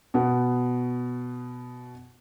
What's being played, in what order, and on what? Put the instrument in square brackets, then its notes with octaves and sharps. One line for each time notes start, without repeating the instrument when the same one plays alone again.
[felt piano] B2 B3